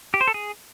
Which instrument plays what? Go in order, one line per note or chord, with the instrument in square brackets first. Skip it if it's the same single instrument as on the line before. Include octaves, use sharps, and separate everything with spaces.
[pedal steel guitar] G4
C5
A4
G#4